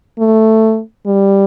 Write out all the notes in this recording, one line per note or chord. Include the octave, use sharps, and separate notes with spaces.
A3
G3